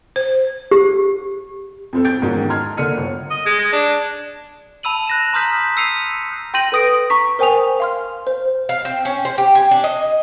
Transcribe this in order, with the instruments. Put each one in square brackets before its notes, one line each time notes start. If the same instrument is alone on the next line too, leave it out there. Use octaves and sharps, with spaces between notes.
[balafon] C5
[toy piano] G4
[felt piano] F2 C4 A4
G6 A6 D7
E2 G#2 D#3 F#3 C#4
A5 A#5 C6 F6 G#6
D3 A#3 D4 F6 C#7 D#7
G1
[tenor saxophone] D#5
G#3
G#3
D4
[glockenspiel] A5 B5 E6 D#7 F#7
F#6 A#6 E7
A#5 C6 D#6 F6 G6 B6
E6 C7 C#7 D#7 F7
[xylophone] G5 C6 G6 A#6 D#7 F#7
A4 B4 D#6 A#6 D7
A#5 C#6 B6
A#4 C5 G5 G#5 D#6 F7
F5 C6 F6
C5
[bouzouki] F5
C4
C#4
C5
G4
G#5
D4
D#5